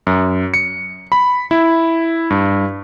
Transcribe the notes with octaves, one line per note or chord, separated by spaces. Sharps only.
F#2
C#7
B5
E4
G2